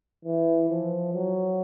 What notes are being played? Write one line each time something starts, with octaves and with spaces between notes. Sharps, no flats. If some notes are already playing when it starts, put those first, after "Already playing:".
E3
F3
F#3